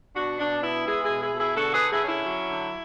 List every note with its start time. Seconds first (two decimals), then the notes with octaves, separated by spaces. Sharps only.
0.16 B2 D4 F#4
0.39 B2 D4
0.62 B3 E4
0.86 G#3 E4 G#4
1.03 E4 G#4
1.09 B2
1.21 E4 G#4
1.33 B2
1.38 E4 G#4
1.56 D3 F#4 A4
1.73 G#4 B4
1.79 D3
1.91 E4 G#4
2.03 C#4
2.08 E4
2.25 F#3
2.50 D3